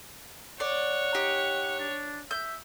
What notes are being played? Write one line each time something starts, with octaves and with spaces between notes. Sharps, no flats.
C#5 D5 F#5
D#4 G4
D4
E5 G6